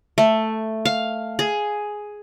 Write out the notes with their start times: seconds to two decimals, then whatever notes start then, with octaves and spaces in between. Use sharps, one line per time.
0.18 A3
0.85 F5
1.39 G#4